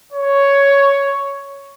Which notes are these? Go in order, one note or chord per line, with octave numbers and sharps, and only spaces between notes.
C#5